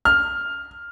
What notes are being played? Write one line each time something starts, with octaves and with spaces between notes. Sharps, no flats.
F6